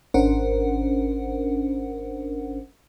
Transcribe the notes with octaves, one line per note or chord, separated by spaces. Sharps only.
G#1 C#4 D4 A#4 C5 F#5